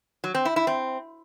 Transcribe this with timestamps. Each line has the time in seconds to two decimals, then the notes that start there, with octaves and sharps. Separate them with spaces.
0.24 F#3
0.35 C4
0.45 E4
0.56 E4
0.67 C4